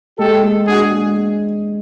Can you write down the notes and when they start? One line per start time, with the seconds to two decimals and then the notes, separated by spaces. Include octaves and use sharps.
0.19 G#3 G4 A4
0.43 G#3
0.68 D4 F#4 G#4
0.92 G#3